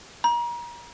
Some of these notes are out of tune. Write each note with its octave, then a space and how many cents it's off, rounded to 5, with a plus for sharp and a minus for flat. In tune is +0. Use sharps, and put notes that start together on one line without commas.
A#5 +35